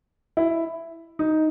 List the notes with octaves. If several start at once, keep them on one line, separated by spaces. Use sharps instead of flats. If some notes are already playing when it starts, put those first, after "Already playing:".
E4
D#4